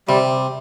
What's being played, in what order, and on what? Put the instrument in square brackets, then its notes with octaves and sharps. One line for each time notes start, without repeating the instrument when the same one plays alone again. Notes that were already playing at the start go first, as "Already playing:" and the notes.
[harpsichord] C3 [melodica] G3